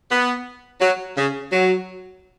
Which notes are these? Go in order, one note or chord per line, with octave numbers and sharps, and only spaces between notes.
B3
F#3
C#3
F#3